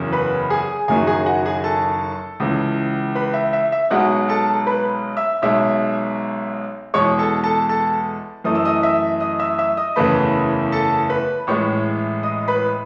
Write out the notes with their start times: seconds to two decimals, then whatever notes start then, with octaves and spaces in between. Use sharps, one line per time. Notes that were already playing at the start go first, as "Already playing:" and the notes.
Already playing: F#1 E2 C#3 F#3
0.12 B4 B5
0.50 G#4 G#5
0.88 F#1 F#2 D#3 F#3 G#4 G#5
1.07 G#4 G#5
1.26 F#4 F#5
1.45 G#4 G#5
1.64 A4 A5
2.40 C#2 C#3 E3
3.15 B4 B5
3.34 E5
3.53 E5
3.72 E5
3.91 B1 B2 G#3 F#4 F#5
4.29 A4 A5
4.67 B4 B5
5.17 E5 E6
5.42 B1 B2 G#3 E5 E6
6.94 E2 B2 G#3 C#5 C#6
7.19 A4 A5
7.44 A4 A5
7.69 A4 A5
8.44 F#2 E3 A3 D#6
8.55 E6
8.65 D#5 D#6
8.83 E5 E6
9.20 D#5 D#6
9.39 E5 E6
9.58 E5 E6
9.77 D#5 D#6
9.96 F#1 E2 C#3 E3 A3 B4 B5
10.72 A4 A5
11.10 B4 B5
11.47 A1 A2 E3 G#3 C#5 C#6
12.23 D#5 D#6
12.48 B4 B5